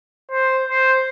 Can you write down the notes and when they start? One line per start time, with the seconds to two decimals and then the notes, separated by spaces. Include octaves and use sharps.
0.31 C5
0.68 C5